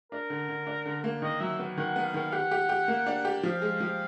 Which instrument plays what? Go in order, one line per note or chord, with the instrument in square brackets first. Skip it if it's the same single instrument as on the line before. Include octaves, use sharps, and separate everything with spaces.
[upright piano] D4 [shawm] A#4
[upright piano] D3
D3
D4
D3
A#3
[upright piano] D#3 [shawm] D#5
[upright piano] F#3 [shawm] E5
[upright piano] B3
[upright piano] D#3 [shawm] F#5
[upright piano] B3
[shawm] F5
[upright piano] D#3
[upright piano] G4 [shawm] F#5
[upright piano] G4
G4
A#3
D4
G4
[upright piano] F3 [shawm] F5
[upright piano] G#3
F3